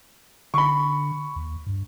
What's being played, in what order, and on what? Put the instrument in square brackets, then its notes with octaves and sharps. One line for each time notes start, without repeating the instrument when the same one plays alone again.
[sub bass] D3 [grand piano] B5 C#6
[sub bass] D#2
G2